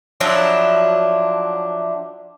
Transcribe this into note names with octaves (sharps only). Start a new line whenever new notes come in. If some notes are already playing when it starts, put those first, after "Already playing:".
F3 F#3 D4 E4